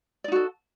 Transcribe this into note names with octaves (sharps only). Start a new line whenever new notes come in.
D#4 F#4 A4 D5